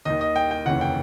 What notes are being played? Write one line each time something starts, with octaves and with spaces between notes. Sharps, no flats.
D#2 D#3 D#5
D#5
G5
G5
F1 D#2 C#3 E3 F#5
G5